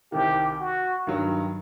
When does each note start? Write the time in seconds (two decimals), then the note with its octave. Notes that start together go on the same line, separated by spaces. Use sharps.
0.12 C2 C3 D#3 G4
0.60 F#4
1.07 G2 D#3 F#3